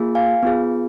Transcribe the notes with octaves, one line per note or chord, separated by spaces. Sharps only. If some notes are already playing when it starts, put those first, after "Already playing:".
Already playing: A#3 F4 G#4
F5 G#5
B3 F4 G#4